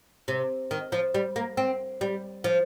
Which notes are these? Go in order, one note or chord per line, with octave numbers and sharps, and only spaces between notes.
C3
D#3
F3
G3
A#3
C4
G3
F3